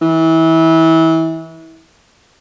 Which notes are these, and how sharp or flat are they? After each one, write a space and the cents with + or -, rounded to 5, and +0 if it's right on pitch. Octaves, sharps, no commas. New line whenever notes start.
E3 -25